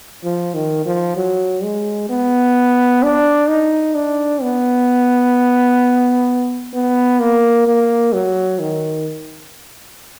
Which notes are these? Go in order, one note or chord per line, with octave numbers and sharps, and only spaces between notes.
F3
D#3
F3
F#3
G#3
B3
D4
D#4
D4
B3
B3
A#3
A#3
F#3
D#3